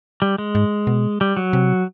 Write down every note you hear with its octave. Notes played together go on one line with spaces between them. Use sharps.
G3
G#3
G#2
B2
G3
F#3
C3